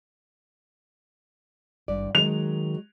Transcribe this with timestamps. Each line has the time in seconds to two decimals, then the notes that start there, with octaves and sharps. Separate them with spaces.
1.88 G#1 G2 D5
2.15 D#3 F#3 G#3 F7